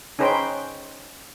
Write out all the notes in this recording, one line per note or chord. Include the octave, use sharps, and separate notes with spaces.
C#4 D#4 G#4 B4 C5 G5